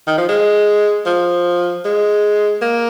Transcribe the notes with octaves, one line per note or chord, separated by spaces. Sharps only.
D#3
F3
G#3
F3
G#3
A#3